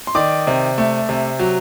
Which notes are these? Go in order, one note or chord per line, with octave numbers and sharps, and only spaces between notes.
C6
D#3 D5 D6
C3
A3
C3
F#3